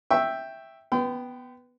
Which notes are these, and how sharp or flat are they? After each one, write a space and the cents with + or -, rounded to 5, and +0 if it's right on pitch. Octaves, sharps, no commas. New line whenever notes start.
E5 +0 G5 +0 C#6 -15
B3 +0 G5 -15 C6 -45